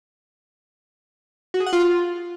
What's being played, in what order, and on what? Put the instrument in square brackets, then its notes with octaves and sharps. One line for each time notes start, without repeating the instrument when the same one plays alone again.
[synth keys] F#4
G#4
F#5
F4